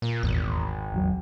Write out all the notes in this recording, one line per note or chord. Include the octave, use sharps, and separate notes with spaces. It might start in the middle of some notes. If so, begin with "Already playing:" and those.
A#2
D#1 G#1 E2
D#1 E2 F#3